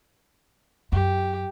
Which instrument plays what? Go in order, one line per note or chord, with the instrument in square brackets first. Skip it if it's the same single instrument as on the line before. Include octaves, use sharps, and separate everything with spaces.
[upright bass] F#2 [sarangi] G4